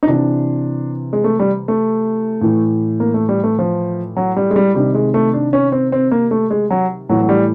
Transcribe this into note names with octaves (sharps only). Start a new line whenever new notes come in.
D#4
C3 E3 D4
G#3
A3
G3
A3
A2 E3
A#3
A3
G3
A3
F3
F#3
G3
G#3
G3
C3 D#3 G3
G#3
A3
D4
C#4
C4
C4
A#3
A3
G#3
F#3
A2 E3 F#3
F#3
G3